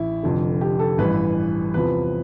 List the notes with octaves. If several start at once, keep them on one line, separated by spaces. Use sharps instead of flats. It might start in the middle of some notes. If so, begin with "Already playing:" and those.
Already playing: A1 E4
F1 F2 D3
G4
A4
A1 G2 E3 B4
E2 C3 F3 B4